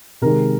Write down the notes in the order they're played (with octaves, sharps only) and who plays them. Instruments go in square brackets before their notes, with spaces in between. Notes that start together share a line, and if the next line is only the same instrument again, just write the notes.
[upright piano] C3 D#3 G#3 A#4